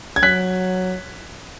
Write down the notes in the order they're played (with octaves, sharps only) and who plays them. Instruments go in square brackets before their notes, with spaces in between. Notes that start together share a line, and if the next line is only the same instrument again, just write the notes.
[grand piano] G#6
[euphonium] F#3 [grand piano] F#6 B6